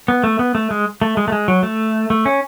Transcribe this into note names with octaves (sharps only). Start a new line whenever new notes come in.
B3
A3
B3
A3
G#3
A3
G#3
A3
G#3
F#3
A3
A3
C#4